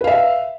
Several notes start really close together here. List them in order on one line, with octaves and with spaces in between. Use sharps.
B4 F5 E5